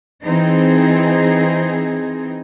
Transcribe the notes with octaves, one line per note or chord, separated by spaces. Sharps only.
E3 C4 D#4 G#4